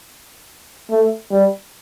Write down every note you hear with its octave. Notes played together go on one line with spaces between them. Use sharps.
A3
G3